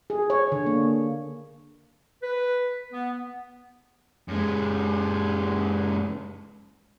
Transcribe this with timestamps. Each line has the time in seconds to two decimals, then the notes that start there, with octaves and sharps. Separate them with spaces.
0.10 G#4
0.30 C#5
0.52 D3
0.66 A#3
2.22 B4
2.92 B3
4.28 F#2 G#3